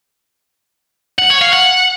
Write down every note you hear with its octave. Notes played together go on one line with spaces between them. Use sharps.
F#5
C#5
F5
F#5